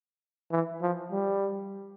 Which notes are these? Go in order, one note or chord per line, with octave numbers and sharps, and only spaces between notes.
E3
F3
G3